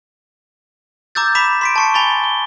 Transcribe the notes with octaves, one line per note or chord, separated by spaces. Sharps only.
A#5 D6 E6 G6 A6
B5 D6 B6 E7
C6 B6 D7
A5 C#6 C#7
G#5 B5 A6 G7
G7